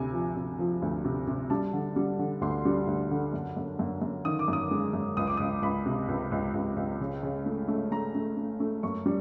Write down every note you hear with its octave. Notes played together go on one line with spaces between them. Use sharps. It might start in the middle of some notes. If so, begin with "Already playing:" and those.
Already playing: D2 C3 G#5
F3
C3
F3
D2
C3
C3
G3 A5
D3
G3
D3
D2 C6
G3
D2
D3
F#2
F#2
F#2
F#2
D#3 D#6
D6
F#2
D#6
G#3
F#2
C#2 D#6
D6
C#2 D#6
C#2 B5
C3
C#2
C#2
C#2
C#2
C#3
C#3
A3
A3
A3 A#5
A3
A3
A3
F#2 C#6
G3